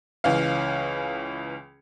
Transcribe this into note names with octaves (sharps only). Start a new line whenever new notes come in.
C#2 E3 C#4 F5